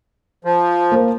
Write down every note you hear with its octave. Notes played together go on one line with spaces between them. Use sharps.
F3
A#3 C5